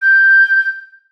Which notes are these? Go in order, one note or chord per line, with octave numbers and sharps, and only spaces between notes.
G6